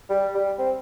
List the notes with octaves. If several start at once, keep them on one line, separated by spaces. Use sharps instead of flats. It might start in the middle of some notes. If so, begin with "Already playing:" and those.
G3
G3
C4